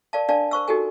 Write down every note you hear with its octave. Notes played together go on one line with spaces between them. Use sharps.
A#4 D5 F5 A5
D4 A#4 D5 F5 A5
A#4 C5 C#6 E6
D#4 F#4 G4 A4 A#4 G#5